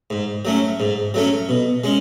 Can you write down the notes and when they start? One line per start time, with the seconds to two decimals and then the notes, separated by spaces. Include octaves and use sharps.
0.10 G#2
0.45 F#3 A3 C#4
0.80 G#2
1.14 F#3 A3 C#4
1.49 B2
1.84 G#3 C#4